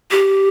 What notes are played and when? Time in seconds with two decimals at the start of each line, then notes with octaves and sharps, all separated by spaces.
0.11 G4